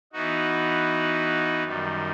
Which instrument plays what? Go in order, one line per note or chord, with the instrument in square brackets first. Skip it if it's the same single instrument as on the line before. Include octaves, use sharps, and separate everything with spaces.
[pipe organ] E3 B3 D#4 F#4
F#2 D#3 G3